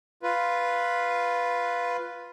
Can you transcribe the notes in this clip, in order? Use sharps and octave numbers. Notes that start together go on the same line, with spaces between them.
F4 B4